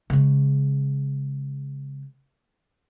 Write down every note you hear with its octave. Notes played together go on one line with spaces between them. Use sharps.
C#3 G#3